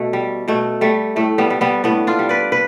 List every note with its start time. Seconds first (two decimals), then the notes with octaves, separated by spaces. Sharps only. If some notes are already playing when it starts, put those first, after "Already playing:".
Already playing: B2 A3
0.13 G3
0.48 B2 A3
0.81 G3 A3
1.16 A2 A3
1.38 G3 B3
1.50 G3
1.61 G3 B3
1.84 A2 B3 D4
2.07 D4 F4
2.19 G3
2.29 B4 D5
2.52 B4